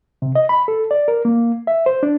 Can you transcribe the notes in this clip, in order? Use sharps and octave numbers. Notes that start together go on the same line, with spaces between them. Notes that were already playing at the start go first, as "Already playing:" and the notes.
C3
D#5
B5
A4
D5
A#4
A#3
E5
C5
D4